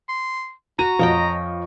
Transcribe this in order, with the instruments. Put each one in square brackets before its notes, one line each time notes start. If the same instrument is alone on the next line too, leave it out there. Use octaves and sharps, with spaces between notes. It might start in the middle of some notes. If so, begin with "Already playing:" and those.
[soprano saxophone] C6
[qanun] F#4 [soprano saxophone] A#5 [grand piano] D#7
[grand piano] F2 F3 [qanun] C#5 D#5 G5